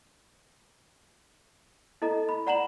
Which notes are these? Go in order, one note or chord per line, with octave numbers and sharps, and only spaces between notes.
E4 A4 D#5 A#5
B5
D5 F#5 A#5 B5 E7 F#7